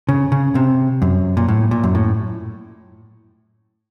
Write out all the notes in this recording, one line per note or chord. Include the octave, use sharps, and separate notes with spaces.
C#3
C#3
C3
F#2
A#2
A2
A#2
F#2
A2